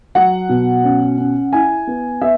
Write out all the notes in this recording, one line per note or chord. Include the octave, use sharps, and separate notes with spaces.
F#3 F#5
B2
C#4
C#4
E4 G#5
B3
B3 E5